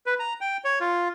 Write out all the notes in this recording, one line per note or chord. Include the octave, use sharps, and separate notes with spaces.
B4
A#5
G5
C#5
F4